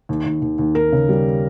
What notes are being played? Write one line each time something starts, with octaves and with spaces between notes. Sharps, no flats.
D#2
D#2
D#2
D#2
D#2 A#4
C#3
G3